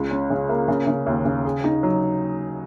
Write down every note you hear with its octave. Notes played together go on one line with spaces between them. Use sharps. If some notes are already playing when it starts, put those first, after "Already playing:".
Already playing: C#2
C#4
C#3
A#3
C#3
C#3
D#2
C#3
G#4
D#4
F#3